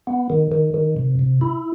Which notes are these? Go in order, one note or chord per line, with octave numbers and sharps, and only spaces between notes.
B3
D#3
D#3
D#3
C3
C3
E4